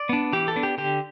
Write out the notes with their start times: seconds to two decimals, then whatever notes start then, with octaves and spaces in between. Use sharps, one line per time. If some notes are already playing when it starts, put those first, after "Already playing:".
Already playing: D5
0.09 B3 D4
0.33 E3 G4
0.48 A4
0.56 B3 D4
0.63 G4
0.78 D3 G4